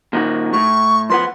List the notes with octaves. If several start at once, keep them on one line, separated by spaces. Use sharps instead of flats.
A#2 D#3 F#4
A2 C#6
F2 B4 F#5 C6